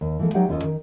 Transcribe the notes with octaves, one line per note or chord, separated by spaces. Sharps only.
D#2
E3 F3 G#3 A#3 A4
F#3 D#4 F4 G4 E5 F#5
D#2 C#4 F4 A4 C5 D#5
D#3